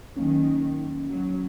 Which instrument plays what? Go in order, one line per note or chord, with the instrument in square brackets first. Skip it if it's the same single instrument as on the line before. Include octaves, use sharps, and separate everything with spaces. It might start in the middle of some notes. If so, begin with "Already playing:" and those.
[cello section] D#3 [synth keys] F#3 A#3 C#4
[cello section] F#3